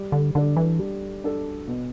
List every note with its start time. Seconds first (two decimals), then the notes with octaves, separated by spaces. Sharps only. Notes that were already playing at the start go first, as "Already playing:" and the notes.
Already playing: G3
0.12 D3
0.35 D3 D4 A4
0.57 E3
0.79 G3
1.24 D4 A4
1.67 B2